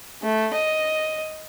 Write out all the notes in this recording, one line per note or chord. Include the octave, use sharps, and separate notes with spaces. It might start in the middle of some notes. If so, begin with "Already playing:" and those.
A3
D#5